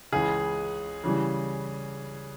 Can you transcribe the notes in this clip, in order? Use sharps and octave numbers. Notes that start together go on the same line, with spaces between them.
C#2 C#3 E3 G#3 G#4
C#3 E3 G3